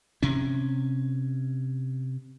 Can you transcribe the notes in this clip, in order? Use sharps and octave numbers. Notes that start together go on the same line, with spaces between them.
C3 C#4